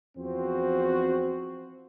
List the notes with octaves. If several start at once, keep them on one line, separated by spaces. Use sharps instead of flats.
E2 F3 C4 F#4 C5